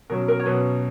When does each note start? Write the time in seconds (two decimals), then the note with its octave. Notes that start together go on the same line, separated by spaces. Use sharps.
0.10 B2 F#3 C#4 A#4
0.28 A#4
0.40 C#5
0.46 B2 F#3 C#4 B4